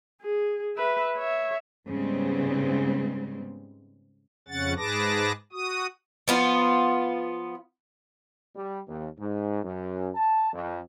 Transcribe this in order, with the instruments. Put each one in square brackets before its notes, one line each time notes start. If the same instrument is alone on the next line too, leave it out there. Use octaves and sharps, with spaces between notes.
[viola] G#4
B4 E5
C#5 E5
[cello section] G#2 C#3 G3 G#3 B3 C4
[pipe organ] F2 C#3 C#4 F#5 A6
G#2 G#4 B4 A5 D6 A#6
F#4 D#6
[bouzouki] F3 B3 F4
[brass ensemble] G3
D#2
G#2
F#2
A5
F2